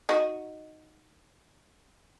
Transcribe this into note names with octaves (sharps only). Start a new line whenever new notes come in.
D#4 F#4 D#5